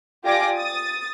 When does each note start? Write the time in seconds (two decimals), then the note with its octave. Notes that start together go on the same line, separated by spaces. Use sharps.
0.25 F4 G4 D5 G#5 D6 A#6
0.56 D#6 A6